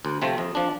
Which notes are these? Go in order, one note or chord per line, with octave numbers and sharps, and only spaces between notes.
D2
C3 F3 A3 C4
F2
F3 D4